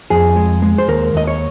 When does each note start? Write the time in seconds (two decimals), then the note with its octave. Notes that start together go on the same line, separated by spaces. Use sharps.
0.10 F2 G#4
0.36 G#3
0.62 G#3
0.78 C5
0.88 D#2 A#4
1.14 D#2 D#5
1.27 C#5